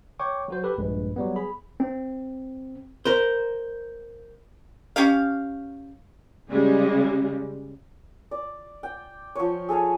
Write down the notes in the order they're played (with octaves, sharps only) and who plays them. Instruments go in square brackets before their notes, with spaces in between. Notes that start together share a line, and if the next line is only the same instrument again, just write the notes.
[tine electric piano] C#5 G5 C#6 D6
F#3 F#4 C5
G4 A4 B4
A#1 G2 G#3 B4
F#3 G3 B3
G#4 B5
C4
[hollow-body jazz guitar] A#4 C5
[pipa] C#4 G4 F5
[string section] C#3 G3 G#3
[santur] D5
G5
F3 C#5
G#4 A4 F5 G#5